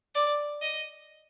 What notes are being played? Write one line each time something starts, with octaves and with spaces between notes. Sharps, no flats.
D5
D#5